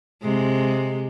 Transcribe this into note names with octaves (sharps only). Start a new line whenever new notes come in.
C3 G#3